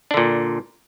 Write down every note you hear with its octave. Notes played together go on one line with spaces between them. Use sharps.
A#2 D3 D4